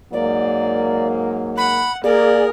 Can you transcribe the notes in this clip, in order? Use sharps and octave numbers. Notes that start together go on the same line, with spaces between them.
G#2 F#3 A#3 D5
F#5 B5
A#3 G#4 A#4 D5